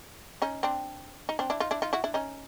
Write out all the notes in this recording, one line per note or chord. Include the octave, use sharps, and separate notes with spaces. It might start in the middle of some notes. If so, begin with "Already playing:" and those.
C#4 D#4
C4 D4
D#4
C4 D4
D4 E4
D#4 F4
D4 E4
D#4 F4
E4 F#4
D4 E4
C#4 D#4